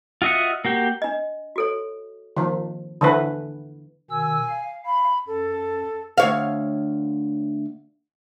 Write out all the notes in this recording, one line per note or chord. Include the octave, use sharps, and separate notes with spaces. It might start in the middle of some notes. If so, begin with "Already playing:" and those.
F4 F#4 D#5 E5 F#5
A#3 F#4 G4
D4 D#5
F#4 A4 C#5
D#3 F3
D3 E3 B4
B2 D#3 G#5 E6
F5
B5
F#2 A4
D2 C#5 F5